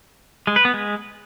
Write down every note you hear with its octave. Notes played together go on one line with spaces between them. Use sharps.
G#3
B4
B3
G#3